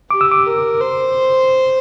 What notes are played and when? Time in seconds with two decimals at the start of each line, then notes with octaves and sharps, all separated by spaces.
0.10 G4 D6
0.21 E6
0.32 D6
0.46 A#4
0.81 C5